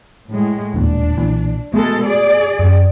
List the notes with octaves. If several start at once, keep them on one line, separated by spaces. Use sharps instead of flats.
A2 G#3
E1 D#2 A#2 D4
B1 A#2 E3
B2 G#3 A3 B3 A4
G#4 D5
F#2